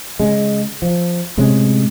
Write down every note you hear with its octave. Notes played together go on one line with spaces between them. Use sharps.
C#3 G#3
F3
A2 C3 G#3 C#4